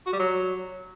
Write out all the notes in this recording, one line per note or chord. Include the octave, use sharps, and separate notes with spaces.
F#4
G3
F#3